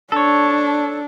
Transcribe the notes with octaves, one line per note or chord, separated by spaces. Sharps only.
D4 A4 C#5